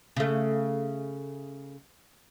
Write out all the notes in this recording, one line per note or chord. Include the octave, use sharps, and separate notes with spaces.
C#3 A3